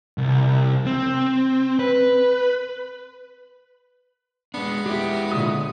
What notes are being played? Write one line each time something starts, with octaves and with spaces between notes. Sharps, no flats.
C2
C4
B4
G#3 B3 D4
G#3 E4 G4
A#2 D3 D#6